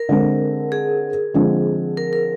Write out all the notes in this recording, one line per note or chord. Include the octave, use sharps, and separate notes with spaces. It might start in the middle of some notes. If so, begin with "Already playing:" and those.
Already playing: A#4
D3 G#3 C4
G#4
D3 F3 G#3 C4
A#4
A#4